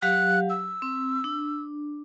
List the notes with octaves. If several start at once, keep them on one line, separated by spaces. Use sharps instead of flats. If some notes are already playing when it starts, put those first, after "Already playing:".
F#3 G4 F5 F#6
E6
C4
D4